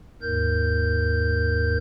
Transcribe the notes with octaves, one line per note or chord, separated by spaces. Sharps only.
D#2 G#2 A#4 G6